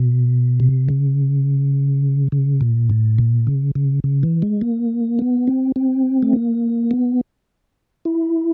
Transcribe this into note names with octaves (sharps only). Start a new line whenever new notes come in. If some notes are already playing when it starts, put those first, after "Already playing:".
Already playing: B2
C3
C#3
C#3
A#2
A2
A#2
C#3
C#3
C#3
E3
G#3
A#3
B3
C4
C4
A3
A#3
B3
E4